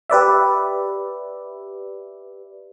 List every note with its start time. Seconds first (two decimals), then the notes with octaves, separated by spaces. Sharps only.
0.10 G4 B4 D5 E5